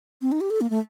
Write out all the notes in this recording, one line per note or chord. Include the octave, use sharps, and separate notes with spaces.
C4
D#4
G4
A4
A#3
A3